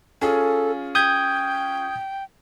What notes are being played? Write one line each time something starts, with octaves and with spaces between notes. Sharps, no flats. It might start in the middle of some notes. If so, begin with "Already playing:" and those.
C#4 F4 G#4 A4
G5 D#6 G6 G#6